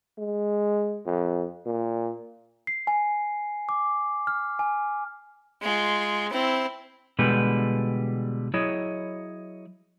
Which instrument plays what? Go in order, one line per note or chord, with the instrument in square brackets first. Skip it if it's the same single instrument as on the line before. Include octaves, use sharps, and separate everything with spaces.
[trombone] G#3
F2
A#2
[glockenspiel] C7
G#5
D6
F6
G#5
[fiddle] G#3 F4
C4 E4
[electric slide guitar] B2 D3 E3 G3 G#3 B4
F#3 E4 G#4 C#5 D#5